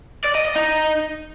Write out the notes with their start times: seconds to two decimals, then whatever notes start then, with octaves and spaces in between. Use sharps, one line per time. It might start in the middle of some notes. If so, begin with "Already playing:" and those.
0.24 D5
0.35 D#5
0.45 D#5
0.56 D#4